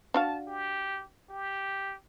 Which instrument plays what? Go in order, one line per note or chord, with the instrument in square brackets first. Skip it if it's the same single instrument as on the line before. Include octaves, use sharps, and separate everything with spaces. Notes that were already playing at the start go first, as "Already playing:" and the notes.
[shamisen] D4 F#4 F5 [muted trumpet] A5
[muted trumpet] G4
G4